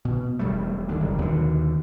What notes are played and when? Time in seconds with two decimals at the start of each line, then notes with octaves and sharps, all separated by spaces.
0.05 B2
0.39 E1 G3 A3
0.89 D#2 D3
1.00 F#1 E2 G3
1.18 D#2 B2 D3